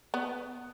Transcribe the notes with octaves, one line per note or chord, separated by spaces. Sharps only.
B3